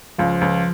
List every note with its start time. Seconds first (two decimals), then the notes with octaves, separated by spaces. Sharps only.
0.18 C#2 F3
0.41 C#2